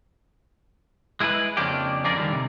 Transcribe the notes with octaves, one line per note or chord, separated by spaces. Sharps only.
G#3 E4 G#4 A4 B4
F2 C#3 F3 A#3 D4 G4
D4 F4 G4 G#4 A#4 D5
D3 D#3 G3
C3